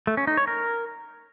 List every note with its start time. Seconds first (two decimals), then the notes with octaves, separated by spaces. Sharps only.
0.07 A3
0.17 C#4
0.27 D#4
0.37 C#5
0.47 A#4